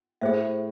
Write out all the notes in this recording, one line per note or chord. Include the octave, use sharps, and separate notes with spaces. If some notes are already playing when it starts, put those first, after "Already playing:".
A2 G#4 C5 E5